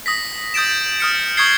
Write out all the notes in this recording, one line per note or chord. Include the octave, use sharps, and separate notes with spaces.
D#6 A#6 B6
D#6 G6 A6 D7 E7
D#6 F6 C#7
C#6 D#6 G6 G#6 C7 G7